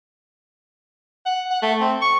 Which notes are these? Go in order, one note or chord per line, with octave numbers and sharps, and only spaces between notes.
F#5
F#5
A3
C4
C#6